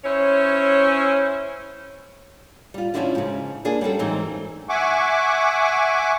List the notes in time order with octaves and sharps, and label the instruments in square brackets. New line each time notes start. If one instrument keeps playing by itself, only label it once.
[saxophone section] C#4 E4 C5 C#5
[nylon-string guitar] G3 F4
F3 G3 C#4 D4 E4 F#4
G#2 C#3
A#3 D4 G#4
G3 C#4 F#4 A4
G#2 E3 F#3 C4 D#4
[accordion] E5 F#5 G#5 C#6 D6